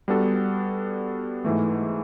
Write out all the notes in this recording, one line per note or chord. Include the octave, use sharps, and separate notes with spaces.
G3 B3 D4 F#4 A4
G#2 E3 A3